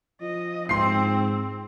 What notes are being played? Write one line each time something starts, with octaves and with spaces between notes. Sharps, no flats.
F3 D#5
G#2 C4 C6 C7